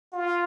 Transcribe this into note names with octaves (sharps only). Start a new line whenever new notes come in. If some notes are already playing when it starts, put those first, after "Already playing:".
F4